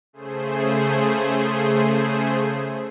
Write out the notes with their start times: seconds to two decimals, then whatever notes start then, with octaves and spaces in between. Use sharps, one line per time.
0.13 C#3 A3 G#4 C5